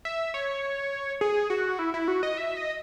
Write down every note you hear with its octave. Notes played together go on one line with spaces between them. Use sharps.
E5
C#5
G#4
F#4
E4
E4
F#4
D#5
E5
D#5